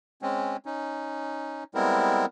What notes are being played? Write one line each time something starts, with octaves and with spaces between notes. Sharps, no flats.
G#3 C4 C#4
C#4 D#4
G3 G#3 B3 C4 E4 A#4